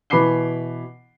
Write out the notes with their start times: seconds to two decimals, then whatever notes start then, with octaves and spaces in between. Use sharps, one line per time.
0.10 B2 E3 B5 D6 C7 G7